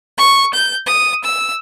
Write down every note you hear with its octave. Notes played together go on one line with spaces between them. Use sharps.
C#6
G6
D#6
E6